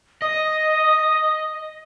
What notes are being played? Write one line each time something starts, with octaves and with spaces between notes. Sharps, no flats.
D#5 D#6